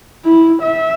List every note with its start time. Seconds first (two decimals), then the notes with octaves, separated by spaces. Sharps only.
0.25 E4
0.62 E5